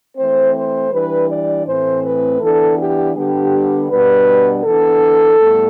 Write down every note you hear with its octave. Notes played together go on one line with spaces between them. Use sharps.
E3 A3 C4 C5
C5
E3 G3 D4 B4
D5
A2 E3 A3 C4 C5
B4
E3 B3 D4 A4
G4
D3 G3 B3 D4 G4
B2 G3 B3 D4 B4
E3 B3 D4 A4
A2 G3 B3